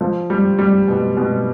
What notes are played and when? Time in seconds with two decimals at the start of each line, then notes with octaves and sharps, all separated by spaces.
0.01 F3
0.30 G3
0.59 G3
0.88 B2
1.17 B2